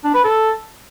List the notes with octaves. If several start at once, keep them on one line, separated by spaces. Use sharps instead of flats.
D4
B4
A4